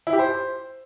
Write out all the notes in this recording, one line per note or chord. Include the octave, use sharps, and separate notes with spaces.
E4
G4
C5